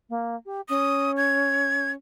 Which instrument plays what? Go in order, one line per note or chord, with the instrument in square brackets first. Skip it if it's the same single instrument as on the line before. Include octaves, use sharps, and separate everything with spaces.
[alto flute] A#3
G4
[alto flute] C#4 [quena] D#6
[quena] G#6